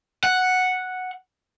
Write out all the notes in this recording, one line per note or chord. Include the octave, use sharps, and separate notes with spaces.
F#5